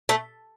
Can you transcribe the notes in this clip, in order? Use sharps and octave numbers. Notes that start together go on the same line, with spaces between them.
A3